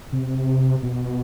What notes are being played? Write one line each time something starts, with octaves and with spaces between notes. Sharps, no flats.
C3
B2